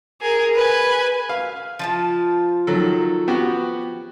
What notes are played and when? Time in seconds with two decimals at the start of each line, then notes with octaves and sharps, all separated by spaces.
0.21 G#4 A#4
0.55 B4 G#5
1.29 F5
1.79 F3 F4 A5
2.67 D#3 F#3 A4
3.28 B3 F#4 G4